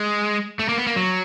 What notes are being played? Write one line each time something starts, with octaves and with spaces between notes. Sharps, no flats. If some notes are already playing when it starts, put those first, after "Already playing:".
Already playing: G#3
A3
A#3
B3
A#3
F#3